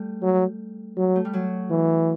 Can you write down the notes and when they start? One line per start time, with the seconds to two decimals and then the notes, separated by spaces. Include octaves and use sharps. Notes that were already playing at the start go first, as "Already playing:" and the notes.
Already playing: G3 A3
0.22 F#3
0.97 F#3
1.16 A3
1.25 G3
1.33 F#3
1.71 E3